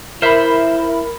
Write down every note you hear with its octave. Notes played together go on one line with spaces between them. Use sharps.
E4 A#4 C5 E5 B5